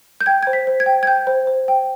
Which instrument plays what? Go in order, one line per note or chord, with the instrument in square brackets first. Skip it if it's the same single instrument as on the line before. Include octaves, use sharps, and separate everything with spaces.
[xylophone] G6
G5 G#6
C5 G#6
B6
C5
G#6
G5
G#6
G5 G6
C5
C5
G5